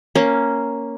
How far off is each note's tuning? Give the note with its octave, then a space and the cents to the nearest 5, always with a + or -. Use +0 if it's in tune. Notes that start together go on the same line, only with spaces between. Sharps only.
A#3 +0 C#4 +0